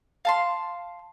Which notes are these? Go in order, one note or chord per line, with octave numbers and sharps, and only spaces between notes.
F5 A5 C6